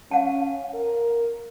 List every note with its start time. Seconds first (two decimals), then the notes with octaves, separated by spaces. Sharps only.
0.11 C#4 F5 F#5 A5
0.74 A#4